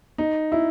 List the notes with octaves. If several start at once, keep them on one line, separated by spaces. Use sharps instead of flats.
D#4
E4